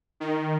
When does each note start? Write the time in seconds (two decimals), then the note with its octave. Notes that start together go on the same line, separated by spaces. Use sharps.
0.20 D#3